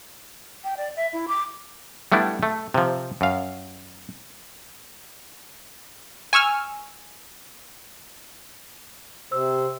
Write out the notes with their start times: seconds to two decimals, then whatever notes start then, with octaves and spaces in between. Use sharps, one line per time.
0.64 G5
0.77 D5
0.96 E5
1.13 E4
1.28 D6
2.12 G3 A3 B3 D4 E4
2.43 A3
2.74 C3 F3
3.21 F#2 F5
6.33 G#5 C#6 E6 F6
9.32 C3 C5 E6